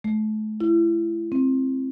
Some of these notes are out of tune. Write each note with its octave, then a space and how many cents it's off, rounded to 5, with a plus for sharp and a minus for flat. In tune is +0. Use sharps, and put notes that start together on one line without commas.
A3 -35
E4 +30
C4 +15